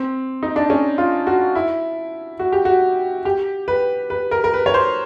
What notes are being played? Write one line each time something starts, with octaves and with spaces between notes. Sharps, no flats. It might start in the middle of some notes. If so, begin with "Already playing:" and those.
Already playing: C4
D#4
D4
C#4
F4
F#4
E4
F#4
G4
F#4
G4
B4
B4
A#4
A#4
B4
C#5
C5